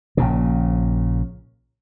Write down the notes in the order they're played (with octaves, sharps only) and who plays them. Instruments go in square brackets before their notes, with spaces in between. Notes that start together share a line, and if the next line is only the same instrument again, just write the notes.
[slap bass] A#1 A#2 C#3